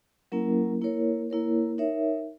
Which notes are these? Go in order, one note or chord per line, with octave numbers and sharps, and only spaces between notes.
F#3 A#3 C#4 E4 A#4
A#3 E4 A#4 C#5
A#3 E4 A#4 C#5
D#4 A#4 C#5 E5